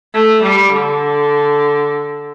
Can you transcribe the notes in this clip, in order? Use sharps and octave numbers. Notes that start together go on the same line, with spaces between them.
A3
G3
D3